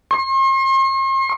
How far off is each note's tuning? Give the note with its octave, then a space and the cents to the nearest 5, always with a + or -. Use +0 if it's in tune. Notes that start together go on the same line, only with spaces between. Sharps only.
C6 +45